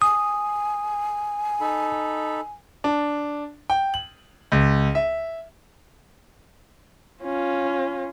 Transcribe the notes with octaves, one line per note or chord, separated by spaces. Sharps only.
G#5 D#6
D#4 A4 B5
D4
G5
F#7
C#2
E5
C#4 F4